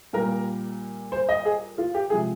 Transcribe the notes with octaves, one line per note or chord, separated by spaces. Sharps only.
A#2 G3 A#3 A#4
C5
D#5
G#4
F4
G4
C3 F3 G#3 G#4